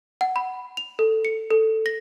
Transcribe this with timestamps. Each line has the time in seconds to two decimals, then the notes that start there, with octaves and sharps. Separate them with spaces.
0.21 F#5
0.36 B5
0.77 F7
0.99 A4
1.25 C#7
1.51 A4
1.86 A#6